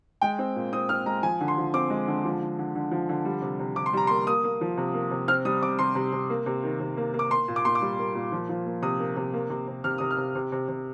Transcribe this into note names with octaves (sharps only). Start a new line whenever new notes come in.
G#3 G5
C4
A#2
C4 D#6
C4 F6
G#3 A#5
F3 G#5
D3
C6
F3
C4 D6
G#3
D3
F3
D3
D3
D3
F3
D3
G3
C3
C3
C3 D6
C6
G3 A#5
C6
A#3
A#3 D#6
A#3
F3
C3
A#3
C3
C4 F6
G3 D#6
C3 D6
C3 C6
C3
C3
A#3
C3
D#3
C3
A#3
A#3
D6
A#3 C6
A#2
D6
A#2 C6
D6
G3
A#3
A#2
F3
F3
A#3
C3 D#6
A#3
C3
A#3
C3
C3
C3 F6
C3 D#6
F6
C3
C3
C3
C3